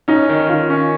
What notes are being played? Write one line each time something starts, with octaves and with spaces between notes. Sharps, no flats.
C#4 D#4
D#3
D#3 F4
C#4